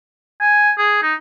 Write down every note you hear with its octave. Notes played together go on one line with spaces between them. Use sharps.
G#5
G#4
D#4